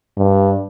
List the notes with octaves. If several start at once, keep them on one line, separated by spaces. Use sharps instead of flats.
G2